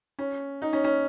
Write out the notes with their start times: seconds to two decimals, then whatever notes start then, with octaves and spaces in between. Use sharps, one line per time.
0.19 C#4
0.62 D#4
0.73 C#4
0.84 C#4